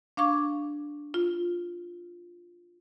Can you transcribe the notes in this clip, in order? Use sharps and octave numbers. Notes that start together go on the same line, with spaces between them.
D4 F5 C#6 D6 G#6
F4